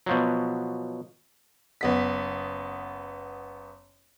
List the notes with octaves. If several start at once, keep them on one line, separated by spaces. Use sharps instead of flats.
B2 F3 F#3
F#1 B3 B6